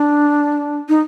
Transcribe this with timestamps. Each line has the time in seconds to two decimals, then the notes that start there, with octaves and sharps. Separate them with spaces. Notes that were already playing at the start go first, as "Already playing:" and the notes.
Already playing: D4
0.89 D#4